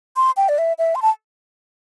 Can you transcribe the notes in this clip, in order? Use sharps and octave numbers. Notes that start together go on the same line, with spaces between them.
C6
G5
D5
E5
E5
C6
A5